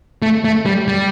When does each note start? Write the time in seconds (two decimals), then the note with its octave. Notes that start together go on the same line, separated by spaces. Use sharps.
0.22 A3
0.44 A3
0.66 G3
0.88 G3